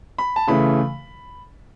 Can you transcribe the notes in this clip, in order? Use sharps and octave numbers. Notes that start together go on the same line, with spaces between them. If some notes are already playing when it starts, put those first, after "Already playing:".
B5
A5
C#3 E3 A3 B5